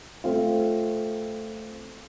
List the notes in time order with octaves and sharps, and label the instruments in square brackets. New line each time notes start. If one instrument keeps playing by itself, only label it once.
[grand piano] A3 C4 F4